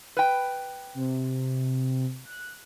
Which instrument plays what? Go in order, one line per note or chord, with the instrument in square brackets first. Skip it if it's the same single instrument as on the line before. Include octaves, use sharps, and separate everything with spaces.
[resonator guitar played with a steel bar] B4 G5
[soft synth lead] C3
F#6